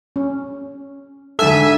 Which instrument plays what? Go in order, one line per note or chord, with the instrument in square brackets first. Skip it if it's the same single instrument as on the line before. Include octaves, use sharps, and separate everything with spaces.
[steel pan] C#4
[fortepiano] D2 G#2 E6 [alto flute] D4 [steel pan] A4 [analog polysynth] E5 G#5